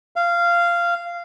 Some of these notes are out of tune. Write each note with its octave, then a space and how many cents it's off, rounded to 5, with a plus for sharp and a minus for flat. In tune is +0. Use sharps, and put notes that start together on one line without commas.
F5 -15